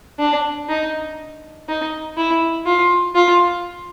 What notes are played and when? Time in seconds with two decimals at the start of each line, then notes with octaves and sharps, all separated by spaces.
0.19 D4
0.69 D#4
1.68 D#4
2.18 E4
2.66 F4
3.15 F4